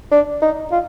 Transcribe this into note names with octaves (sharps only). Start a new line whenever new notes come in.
D4
D#4
F4